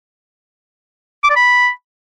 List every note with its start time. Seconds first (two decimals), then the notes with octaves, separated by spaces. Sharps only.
1.24 D6
1.30 D5
1.36 B5